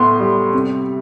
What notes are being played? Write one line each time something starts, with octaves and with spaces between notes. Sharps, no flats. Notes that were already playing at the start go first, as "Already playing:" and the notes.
Already playing: A2 B3 C6
G3
C3